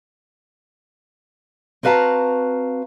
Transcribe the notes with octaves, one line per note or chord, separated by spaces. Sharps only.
C4 F#4 B4 F5 A5 A#5